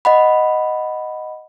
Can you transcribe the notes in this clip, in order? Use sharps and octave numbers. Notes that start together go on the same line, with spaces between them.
D#5 F#5 B5